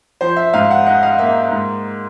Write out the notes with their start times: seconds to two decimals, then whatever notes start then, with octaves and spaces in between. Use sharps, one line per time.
0.21 F3 C5
0.37 E5
0.54 G#2 F5
0.71 F#5
0.86 D#4 F#5
1.03 F5
1.19 A#3 E5
1.51 G#2